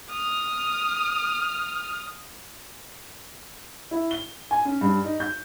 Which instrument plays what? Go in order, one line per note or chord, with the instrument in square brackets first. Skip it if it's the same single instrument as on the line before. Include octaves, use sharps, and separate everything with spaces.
[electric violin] D#6 F6
[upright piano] E4
G7
G#5
C#4
G2
D#4
G6